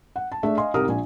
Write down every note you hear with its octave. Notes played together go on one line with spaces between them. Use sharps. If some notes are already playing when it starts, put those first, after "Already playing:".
F#5
A5
A3 D4 G#4 E5
D#5 F5 G#5 C6
C2 G#2 G4 A#4 D#6 F6
A#1 G#5